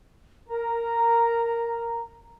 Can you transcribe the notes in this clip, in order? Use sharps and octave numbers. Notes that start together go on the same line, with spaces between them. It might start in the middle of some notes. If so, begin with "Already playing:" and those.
A#4 A#5